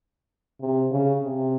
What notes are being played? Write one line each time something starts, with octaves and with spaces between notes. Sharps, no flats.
C3
C#3
C3